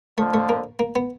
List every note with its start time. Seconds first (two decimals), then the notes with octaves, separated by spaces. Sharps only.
0.18 F2 D3 F3 A3
0.34 A3
0.49 A#3
0.79 A#3
0.96 B3